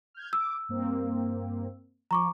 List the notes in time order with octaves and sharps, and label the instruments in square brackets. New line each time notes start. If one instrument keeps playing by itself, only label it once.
[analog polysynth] F6 G6 G#6
[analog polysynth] D6 [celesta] E6
[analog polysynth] G2 A#3 C4
[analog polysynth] F3 [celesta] A#5 C#6 D6